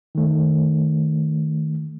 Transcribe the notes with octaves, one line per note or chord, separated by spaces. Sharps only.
D#3 A3